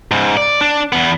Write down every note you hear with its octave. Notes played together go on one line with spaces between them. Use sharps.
G#2 C#3
D5
D4
E2 B3